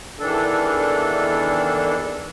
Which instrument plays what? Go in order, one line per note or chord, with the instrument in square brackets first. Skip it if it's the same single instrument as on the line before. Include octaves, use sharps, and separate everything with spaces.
[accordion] E2 D#3 E3 D4 A4